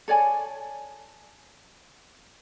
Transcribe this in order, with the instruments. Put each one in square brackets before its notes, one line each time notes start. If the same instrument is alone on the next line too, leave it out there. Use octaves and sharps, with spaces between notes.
[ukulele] A4 C#5 D5 G#5